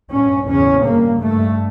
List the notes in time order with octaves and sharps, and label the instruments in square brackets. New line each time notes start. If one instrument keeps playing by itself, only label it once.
[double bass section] G2 C#4
E2 C#3 C#4
G2 A#3
G2 A3